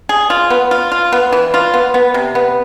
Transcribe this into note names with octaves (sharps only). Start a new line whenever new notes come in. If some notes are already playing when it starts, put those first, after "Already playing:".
G#4
F4
B3
F4
F4
B3
E3
F4
B3
B3
C3
B3